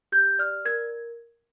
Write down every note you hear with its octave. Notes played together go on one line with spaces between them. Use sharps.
G4 G6
D5 F6
A#4 G#6